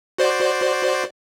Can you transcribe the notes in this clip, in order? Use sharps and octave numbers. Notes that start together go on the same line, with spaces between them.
F#4 C5 D5